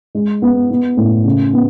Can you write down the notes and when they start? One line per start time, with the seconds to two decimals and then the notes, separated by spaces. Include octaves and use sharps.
0.15 G#3
0.42 B3
0.70 B3
0.97 A2
1.25 C#3
1.53 B3